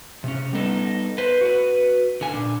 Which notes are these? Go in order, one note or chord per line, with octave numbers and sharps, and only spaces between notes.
C3 C#4
G3 B3 D#4 A4
B4 C5
F#4 B4
D3 G#5
A#2 D4